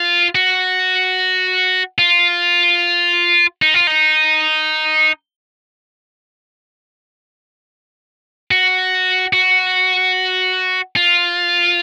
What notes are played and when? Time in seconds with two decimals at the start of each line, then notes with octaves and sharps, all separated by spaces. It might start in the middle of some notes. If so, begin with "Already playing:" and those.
Already playing: F4
0.35 F#4
1.98 F4
3.62 D#4
3.74 F4
3.87 D#4
8.51 F#4
9.33 F#4
10.96 F4